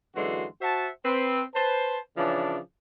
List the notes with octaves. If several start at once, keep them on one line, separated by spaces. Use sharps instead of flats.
F#2 D3 E3 G#3 F#4 C6
F#4 C5 E5 F#5 A5
C4 B4
B4 C5 A5
C#3 E3 F3 C#4 D4